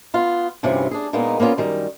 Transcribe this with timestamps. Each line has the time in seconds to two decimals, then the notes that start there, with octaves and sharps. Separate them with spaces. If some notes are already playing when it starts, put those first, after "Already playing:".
0.14 B3 F4
0.63 D2 G2 C3 E3 C#4 F4
0.91 D4 G#4
1.13 A#2 G#3 A#3 B3 D#4 F4
1.40 A#3 B3 C#4 F4 D5
1.57 F#2 D#3 G3